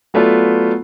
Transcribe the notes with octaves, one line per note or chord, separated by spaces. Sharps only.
F#3 A3 B3 F4 D5